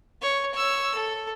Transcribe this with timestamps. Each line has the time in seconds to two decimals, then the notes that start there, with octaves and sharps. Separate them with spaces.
0.22 C#5
0.54 C#5 E6
0.95 A4